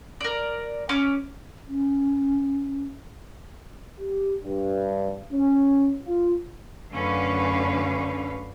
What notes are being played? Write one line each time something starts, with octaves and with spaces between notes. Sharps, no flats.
A#4 D5
C#4 D6
C#4
G4
G2
C#4
F4
F#2 D3 A3 C#4 B4 F5